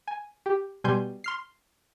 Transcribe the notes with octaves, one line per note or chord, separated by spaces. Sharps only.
G#5
G4
B2 G3 G#5 C6 G6
C6 F6 C7